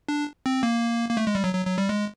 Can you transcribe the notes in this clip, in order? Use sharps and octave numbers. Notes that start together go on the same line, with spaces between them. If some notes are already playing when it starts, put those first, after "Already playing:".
D4
C4
A#3
A#3
A3
G#3
G3
F#3
F#3
F#3
G3
G#3